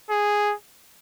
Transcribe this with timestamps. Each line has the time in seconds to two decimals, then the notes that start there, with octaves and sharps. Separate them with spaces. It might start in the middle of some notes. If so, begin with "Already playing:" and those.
0.10 G#4